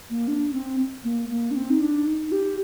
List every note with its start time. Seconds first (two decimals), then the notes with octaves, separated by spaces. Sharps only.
0.10 A#3
0.28 D4
0.53 C4
1.04 A#3
1.29 A#3
1.51 D4
1.56 C4
1.70 D#4
1.80 D4
2.06 D#4
2.32 G4